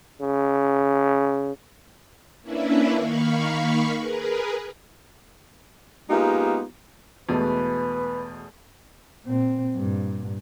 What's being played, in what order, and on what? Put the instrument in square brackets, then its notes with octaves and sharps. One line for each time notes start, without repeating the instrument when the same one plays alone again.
[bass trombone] C#3
[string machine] A#3 C#4 D4 E4 B4 E5
D#3 A#3 F5 B5 C#6
G#4 A#4 B4
[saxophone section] G#3 A#3 B3 D#4 F4 G4
[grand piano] E2 G#3 A3 [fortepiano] B2 [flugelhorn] B4
[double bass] A#2 C4
G2 A#2